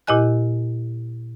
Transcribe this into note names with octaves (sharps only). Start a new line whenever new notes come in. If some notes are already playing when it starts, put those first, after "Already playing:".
A#2 E4 G4 D#5 G#5 F#6